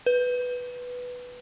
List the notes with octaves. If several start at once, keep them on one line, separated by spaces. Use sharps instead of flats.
B4